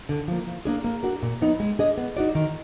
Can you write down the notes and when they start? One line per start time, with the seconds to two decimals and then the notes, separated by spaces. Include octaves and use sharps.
0.09 D3
0.28 F3 A#3
0.47 F3
0.65 A#3 D4 G#4
0.84 A#3
1.03 D4 F#4 A#4
1.23 A#2
1.41 F#3 B3 D#4
1.60 G#3
1.79 D4 G#4 D#5
1.98 B3
2.17 D#4 F#4 D5
2.35 D#3